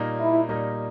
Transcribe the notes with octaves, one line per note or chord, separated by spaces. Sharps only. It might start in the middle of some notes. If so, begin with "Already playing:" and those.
Already playing: A#2 G3 A#3 D#4
E4
A#2 G3 A#3 D#4